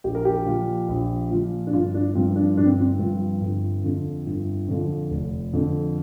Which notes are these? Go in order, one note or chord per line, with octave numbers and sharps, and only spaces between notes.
A#1 G4
A#4
G4
A#2 F3
A#1
A#2 F3
D4
G1 F4
D4
G2 F3 C4
D4
G1 D4
C4
C4
G2 F3
G1
F2 D3 F3
G1
F2 D3 F3
F1
F2 D3